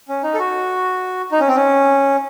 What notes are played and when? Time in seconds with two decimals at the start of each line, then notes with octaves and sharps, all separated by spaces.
0.08 C#4
0.23 D#4
0.34 A4
0.39 F#4
1.32 D#4
1.40 C#4
1.48 C4
1.56 C#4